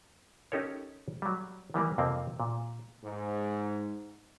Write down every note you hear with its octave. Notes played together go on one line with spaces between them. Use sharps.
C#4 D#4 G4 A4 A#4 C#5
F#3 G3
D#3 E3 G3 A#3
F2 C3 F3 A#3 C4
A#2
G#2